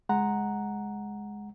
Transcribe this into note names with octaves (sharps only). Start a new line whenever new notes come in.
C#2 G#3 F#5 A#5